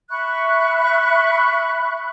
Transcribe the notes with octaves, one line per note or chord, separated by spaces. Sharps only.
E5 B5 C#6 F#6